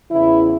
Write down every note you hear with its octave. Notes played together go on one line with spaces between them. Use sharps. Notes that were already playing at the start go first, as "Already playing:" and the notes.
E2 C#3 E3 E4